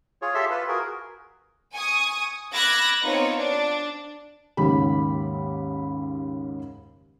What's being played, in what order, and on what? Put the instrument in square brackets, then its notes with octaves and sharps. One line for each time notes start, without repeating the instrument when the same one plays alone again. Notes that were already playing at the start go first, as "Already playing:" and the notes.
[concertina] F4 G#4 C#5
G4 A4 E5 C6 E6
F4 B4
F#4 G#4 A#4
[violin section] G#5 C#6 D#6
B5 D6 E6 F#6 G#6 A#6
B3 C4 D#4 F4 C#5
D4
[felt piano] D#2 G#2 C#3 G4 B5